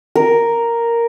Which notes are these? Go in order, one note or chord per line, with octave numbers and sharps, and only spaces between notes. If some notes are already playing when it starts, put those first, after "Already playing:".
A#4